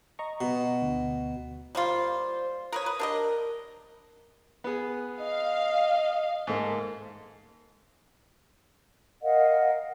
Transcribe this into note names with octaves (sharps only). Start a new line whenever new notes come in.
D#5 A#5 C#6
B2
D2
G3 A#3 F4 C5
A#4 B4 C#5 D#6
B4
D4 G4 A#4 D#5
B3 G#4
D#5 F5
G#2 A3 A#3
A#4 D#5 F5 F#5